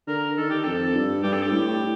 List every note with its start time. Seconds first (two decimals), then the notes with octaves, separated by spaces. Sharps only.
0.07 D3 A#4
0.37 D#3 A4
0.50 G4
0.64 F2 A4
0.95 G2
1.23 G2 G4
1.33 A4
1.43 G4
1.52 A2